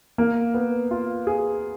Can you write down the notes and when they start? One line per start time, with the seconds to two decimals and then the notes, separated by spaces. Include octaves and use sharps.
0.18 A#3
0.54 B3
0.91 F4
1.27 G#4